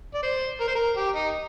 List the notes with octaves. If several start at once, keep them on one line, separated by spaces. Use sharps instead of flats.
D5
C5
A#4
C5
A#4
G4
D#4